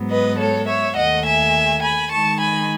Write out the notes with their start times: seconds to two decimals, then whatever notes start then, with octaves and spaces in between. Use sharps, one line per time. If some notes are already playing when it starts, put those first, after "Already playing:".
Already playing: G#2 F#3 B3
0.10 B4 D#5
0.39 A4 C#5
0.68 C#5 E5
0.96 D#2 D#3 A3 D#5 F#5
1.26 E5 G#5
1.83 G#5 B5
2.12 D#3 G#3 D#4 A5 C#6
2.41 G#5 B5